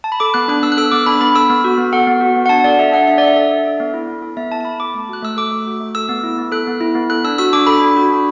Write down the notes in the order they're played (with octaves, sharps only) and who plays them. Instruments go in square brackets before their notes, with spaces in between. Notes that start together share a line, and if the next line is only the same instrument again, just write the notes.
[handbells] A5
B5
A4 D6
B3 F#6
D4 F#6
B3 E6
F#6
A4 E6
B3 D6
D4 B5
B3 B5
A4 E6
B3
F#4
B3
A4 F#5
B3
F#4
B3
F#5
D4 A5
A4 D5
A4 E5
D4 F#5
D4 E5
A4 D5
E5
A4
D4
A4
B3
E4
B3
A4
B3 E5
E4 A5
A5
B3 B5
A4 D6
A3
F#4 F#6
A3 E6
A4 D6
A3
F#4
A3
A4 E6
B3
E4
B3
A4 F#6
B3
E4
B3
A4 F#6
D4 E6
F#4 E6
D4 D6
A4 B5
D4
F#4
D4